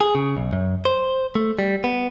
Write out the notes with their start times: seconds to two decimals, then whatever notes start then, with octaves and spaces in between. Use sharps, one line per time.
0.01 G#4
0.15 C#3
0.37 B1
0.53 F#2
0.85 C5
1.35 A3
1.59 G3
1.84 B3